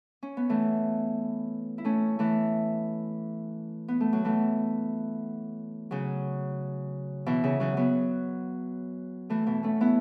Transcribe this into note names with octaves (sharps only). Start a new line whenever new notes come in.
C#4
B3
E3 A3
E4
A3 C#4
E3 A3
B3
A3
F#3
E3 A3
C#3 F#3
B2 E3
C#3
C#3 F#3
F#3 B3
E3 A3
B2 E3
A3 C#4
B3 E4